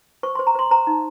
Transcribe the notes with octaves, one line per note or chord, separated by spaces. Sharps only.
C5 C#6
C6
C5
A#5
C5 C6
C5 A#5
D#4